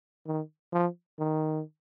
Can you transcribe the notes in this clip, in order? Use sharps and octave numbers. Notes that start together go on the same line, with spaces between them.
D#3
F3
D#3